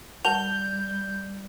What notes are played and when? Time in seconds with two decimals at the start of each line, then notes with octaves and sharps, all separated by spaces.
0.25 G3 F#4 A#4 A5 G6 F7